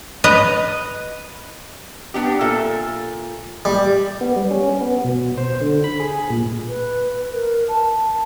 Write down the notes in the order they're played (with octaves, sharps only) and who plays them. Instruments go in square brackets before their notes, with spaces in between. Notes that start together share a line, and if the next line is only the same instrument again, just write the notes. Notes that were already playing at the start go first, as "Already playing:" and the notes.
[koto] B4 D#5 A#5
[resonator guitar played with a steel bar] B3 D4 G4
A#2 A4 E5
[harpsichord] G3
[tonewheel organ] B3
G3
C#4
B3
B2
C5
D3
B5
G#4
A#2
[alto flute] B4
A#4
A5